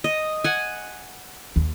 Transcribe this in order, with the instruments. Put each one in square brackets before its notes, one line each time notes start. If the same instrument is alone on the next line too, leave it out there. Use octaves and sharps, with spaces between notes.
[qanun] D#5
F#5 G#5
[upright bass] D#2